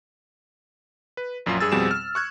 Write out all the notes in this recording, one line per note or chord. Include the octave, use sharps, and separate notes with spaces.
B4
A#1 F#2 F#3 F4 C6
G2 G#4 E6 A6
F2 B2 G3 C4 G#4 E7
F6
C#6 F#6 G#6